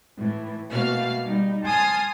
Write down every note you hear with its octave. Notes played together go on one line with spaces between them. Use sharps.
A2 E3
B2 A3 A#3 F#4 F5 F6
G3 D#4
G#5 A5 C6 D#6 F6